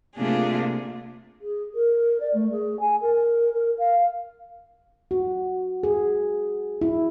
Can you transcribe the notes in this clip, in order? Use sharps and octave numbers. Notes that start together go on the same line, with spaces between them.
C3 A3 A#3 D4 F4 G#4
G#4
A#4
D5
A3
G#4
G#5
A#4
A#4
F5
F#4
G#4
E4